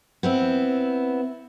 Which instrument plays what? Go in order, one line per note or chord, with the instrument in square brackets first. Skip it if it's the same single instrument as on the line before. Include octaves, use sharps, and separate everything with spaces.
[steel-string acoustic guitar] B3 C4 E4